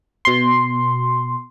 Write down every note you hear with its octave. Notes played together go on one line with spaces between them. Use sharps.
B2 C6